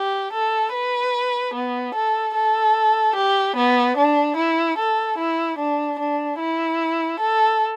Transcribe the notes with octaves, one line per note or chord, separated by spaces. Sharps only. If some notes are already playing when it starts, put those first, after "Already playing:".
Already playing: G4
A4
B4
B3
A4
A4
G4
B3
D4
E4
A4
E4
D4
D4
E4
A4